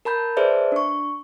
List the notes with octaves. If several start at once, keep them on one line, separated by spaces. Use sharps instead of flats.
A#4 A5 B5 G6
G#4 B4 C5 D5 E5 A5
D4 C#6